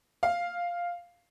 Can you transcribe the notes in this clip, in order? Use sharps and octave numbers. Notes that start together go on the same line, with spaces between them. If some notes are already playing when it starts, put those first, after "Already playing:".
F5